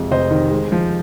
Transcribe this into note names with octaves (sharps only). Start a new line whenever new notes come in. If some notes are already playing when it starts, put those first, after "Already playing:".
Already playing: F2 C3 G#3
F1 C5 D#5
D#3
G#3
F3